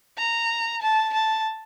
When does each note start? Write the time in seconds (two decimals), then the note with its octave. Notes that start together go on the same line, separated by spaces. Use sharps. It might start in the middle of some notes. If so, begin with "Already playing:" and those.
0.17 A#5
0.81 A5
1.13 A5